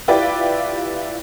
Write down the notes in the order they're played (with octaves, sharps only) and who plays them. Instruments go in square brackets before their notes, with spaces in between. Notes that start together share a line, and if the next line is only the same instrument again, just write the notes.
[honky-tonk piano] E4 F4 G4 B4 D5 G5